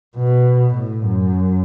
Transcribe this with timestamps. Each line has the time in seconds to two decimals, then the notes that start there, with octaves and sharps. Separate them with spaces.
0.17 B2
0.75 A2
1.04 F#2